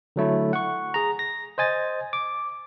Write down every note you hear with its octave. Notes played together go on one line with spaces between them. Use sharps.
D3 F#3 A3 E4
F#5 C#6
G#4 A#5
A#6
C5 D#5 G#5 A6
D6